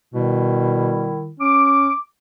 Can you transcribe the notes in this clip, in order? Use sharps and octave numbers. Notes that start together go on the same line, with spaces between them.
B2 D#3 G3 E4
C#4 D6